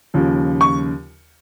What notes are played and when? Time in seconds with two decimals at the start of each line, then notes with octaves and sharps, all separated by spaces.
0.14 D#2 C#3 F3
0.61 C#6